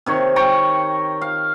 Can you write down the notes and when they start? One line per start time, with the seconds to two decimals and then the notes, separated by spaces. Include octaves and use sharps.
0.06 C3 D#3 C#5
0.36 G5 A#5 C#6
1.21 F5